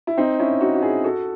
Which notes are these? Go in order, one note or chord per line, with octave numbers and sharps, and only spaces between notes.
E4
C4 D#4
C#4 E4
D#4 F#4
F#4
E4 G#4
F#4 A4